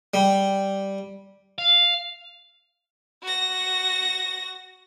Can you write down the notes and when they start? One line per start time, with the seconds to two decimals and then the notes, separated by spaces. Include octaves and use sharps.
0.14 G3
1.58 F5
3.23 F#4 A#6